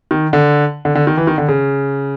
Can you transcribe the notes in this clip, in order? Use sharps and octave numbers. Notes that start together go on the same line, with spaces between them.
D#3
D3
D3
D3
D#3
E3
D#3
D3
C#3